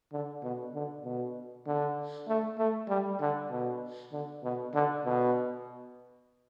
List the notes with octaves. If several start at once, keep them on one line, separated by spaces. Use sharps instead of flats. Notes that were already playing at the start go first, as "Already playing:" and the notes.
D3
B2
D3
B2
D3
A3
A3
G3
D3
B2
D3
B2
D3
B2